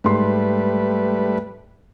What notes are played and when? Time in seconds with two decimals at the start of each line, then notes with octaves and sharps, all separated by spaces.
0.04 G#2 G3 A3 B4 C6